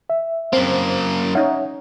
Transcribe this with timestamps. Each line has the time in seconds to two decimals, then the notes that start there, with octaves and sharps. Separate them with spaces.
0.10 E5
0.53 F#2 A#3 C4 C5
1.35 C#4 D#4 C#5 E5 F#5